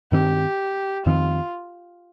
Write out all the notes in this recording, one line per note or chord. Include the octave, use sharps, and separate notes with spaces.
G2 D#3 C4 G4
F2 D#3 C4 F4